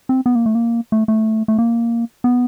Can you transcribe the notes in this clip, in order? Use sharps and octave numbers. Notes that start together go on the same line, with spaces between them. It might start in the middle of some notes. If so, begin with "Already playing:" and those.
C4
B3
A#3
A3
A#3
A3
A3
A3
A#3
B3